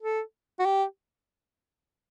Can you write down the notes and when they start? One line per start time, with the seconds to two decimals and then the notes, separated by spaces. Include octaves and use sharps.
0.02 A4
0.59 F#4
0.65 G4